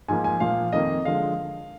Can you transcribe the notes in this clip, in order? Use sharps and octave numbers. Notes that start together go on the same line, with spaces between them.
G#2 F3 A#3 G#5
G#5
A#2 F3 A#3 F5
F2 D#3 A#3 D#5
D3 F3 G#3 F5